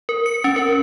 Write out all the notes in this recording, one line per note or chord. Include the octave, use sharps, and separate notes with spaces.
A#4
C#7
C#4
A#4